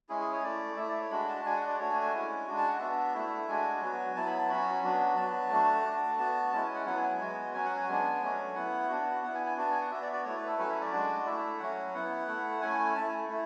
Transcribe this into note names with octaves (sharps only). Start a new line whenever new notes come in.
G#3 C#4 E4 G#4
G#4
C#5
A3 E4 D5
A3 E4 E5
D5
C#5
G#3 D4 F#4 B5
A5
G#3 D4 F#4 G#5
F#5
D5
A3 D4 F#4 C#5
G#5
G#5
G#3 C#4 E4
G#3 D4 F#4
A5
F#5
B3 D4 F#4 E5
A3 E4
G#3 D4 F#4 G#5
F#3 B3 F#4
F#3 B3 E4 A5
B5
A5
F#3 C#4 F#4 B5
F#3 B3 D4 F#4
F#3 B3 F#4 A5
A3 D4 F#4
A3 D4 F#4
B3 F#4 A5
G#3 C#4 E4 A5
G#5
F#5
F#3 B3 E4 F#5
G#5
G#5
G#3 B3 F#4
F#3 C#4 F#4 G#5
F#5
G#5
G#3 B3 D4
F#3 A3 C#4 F#4
B3 E4 F#5
B3 D4 F#4
B3 E4 F#5
G#5
G#5
B3 D4 F#4 A5
G#5
F#5
B3 F#4 E5
D5
D5
A3 E4 C#5
B4
A4
F#3 A3 C#4 E4 B4
E5
D5
G#3 D4 F#4
A3 E4 E5
F#3 C#4 F#4 F#5
B3 E4 F#5
A3 E4
A3 C#4 E4 G#5
A3 E4 A5
G#5
A3 E4